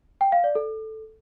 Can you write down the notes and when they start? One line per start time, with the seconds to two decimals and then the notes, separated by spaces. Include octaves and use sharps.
0.21 G5
0.32 F5
0.44 D5
0.55 A4